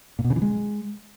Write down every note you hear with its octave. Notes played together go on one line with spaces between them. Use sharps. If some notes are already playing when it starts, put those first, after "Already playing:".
A#2
B2
C#3
E3
G#3